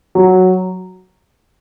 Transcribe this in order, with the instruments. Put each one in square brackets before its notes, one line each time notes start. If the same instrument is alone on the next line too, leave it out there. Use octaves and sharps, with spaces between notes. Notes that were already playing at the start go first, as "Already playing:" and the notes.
[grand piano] F#3